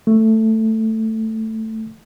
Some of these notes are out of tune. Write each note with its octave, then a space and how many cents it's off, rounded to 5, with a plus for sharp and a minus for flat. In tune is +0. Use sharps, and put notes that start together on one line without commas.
A3 +10